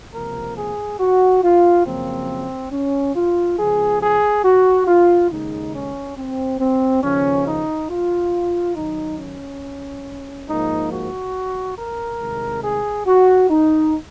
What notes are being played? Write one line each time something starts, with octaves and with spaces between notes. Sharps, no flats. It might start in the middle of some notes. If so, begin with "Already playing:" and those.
C#2 C3 F3 A#3 A#4
G#4
F#4
F4
F#2 C#3 F3 A#3 C4
C#4
F4
C#2 C#3 F3 G#4
G#4
F#4
F4
D#2 C#3 G#3 D#4
C#4
C4
C4
D#2 C#3 F3 C#4
D#4
F4
F#2 D#3 F#3 D#4
C#4
G#2 F3 A#3 D#4
F#4
A#4
C2 C3 D#3 G#3
G#4
F#4
D#4